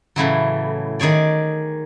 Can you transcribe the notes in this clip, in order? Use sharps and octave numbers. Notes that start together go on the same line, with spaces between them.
A2 C#3 E3 F#3
D#3 G#4 C#5 D5